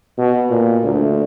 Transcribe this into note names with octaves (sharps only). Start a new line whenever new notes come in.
B2
A#2
D2